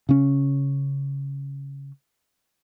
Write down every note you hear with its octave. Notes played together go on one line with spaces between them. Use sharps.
C#3 C#4